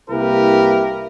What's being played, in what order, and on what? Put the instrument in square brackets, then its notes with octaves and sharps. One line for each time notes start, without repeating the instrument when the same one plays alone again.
[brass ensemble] C2 A#3 E4 G4 A#4 B4